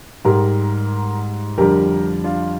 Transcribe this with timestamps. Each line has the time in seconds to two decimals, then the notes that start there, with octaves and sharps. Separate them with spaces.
0.25 G#2 G3 G4 A#4
1.58 F2 D3 G3 G4 A#4
2.24 D4 F4